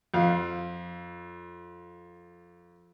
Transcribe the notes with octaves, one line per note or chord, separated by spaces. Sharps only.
F2 F5